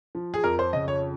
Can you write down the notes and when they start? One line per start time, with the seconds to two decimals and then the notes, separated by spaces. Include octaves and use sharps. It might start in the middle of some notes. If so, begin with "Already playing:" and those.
0.15 F3
0.34 G#4
0.44 F2 A#4
0.59 C5
0.73 C#3 D#5
0.88 C#5